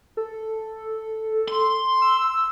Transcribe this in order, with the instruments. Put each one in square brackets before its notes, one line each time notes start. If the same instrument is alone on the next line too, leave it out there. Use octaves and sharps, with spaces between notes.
[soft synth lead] A4
[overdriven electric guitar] C6
[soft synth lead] E6